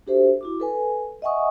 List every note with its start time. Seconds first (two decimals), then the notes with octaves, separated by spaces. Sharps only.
0.07 D4 F#4 G4 A4 C5 E5
0.41 E4 F#4 D6
0.60 A4 B4 G#5
1.22 D#5 E5 F#5 G#5 C#6 D#6